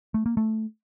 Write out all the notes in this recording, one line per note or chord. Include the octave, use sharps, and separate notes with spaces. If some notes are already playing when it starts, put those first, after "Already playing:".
A3
A#3
A3